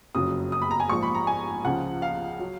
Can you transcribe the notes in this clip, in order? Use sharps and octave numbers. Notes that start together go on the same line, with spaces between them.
F#1 F2 C#3 F#3 D#6
D#6
B5
A#5
G#5
A#1 G#2 F3 C#6
B5
A#5
G#5
C#2 C#3 F3 F#5
F5
F#3